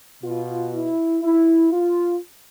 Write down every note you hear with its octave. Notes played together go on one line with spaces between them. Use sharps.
B2 F4
E4
E4
F4